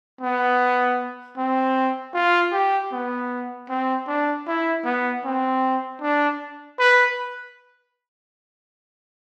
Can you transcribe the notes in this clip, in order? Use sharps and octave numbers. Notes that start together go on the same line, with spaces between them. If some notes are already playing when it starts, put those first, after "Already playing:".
B3
C4
F4
G4
B3
C4
D4
E4
B3
C4
D4
B4